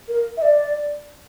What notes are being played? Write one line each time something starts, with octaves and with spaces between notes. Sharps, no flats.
A#4
E5
D5